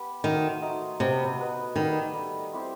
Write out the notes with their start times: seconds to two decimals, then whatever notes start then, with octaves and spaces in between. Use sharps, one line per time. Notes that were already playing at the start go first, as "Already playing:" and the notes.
Already playing: B3 G4 B4
0.24 D#3 A3 D#4 F#4 C5
0.61 A3 D#4 F#4 C5
1.00 C3 B3 F#4 B4 D#5
1.38 B3 F#4 B4 D#5
1.76 D#3 G3 D#4 A4
2.13 G3 D#4 A4
2.52 C4 E4 G4 C5